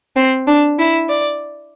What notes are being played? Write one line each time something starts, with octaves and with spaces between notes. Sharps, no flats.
C4
D4
E4
D5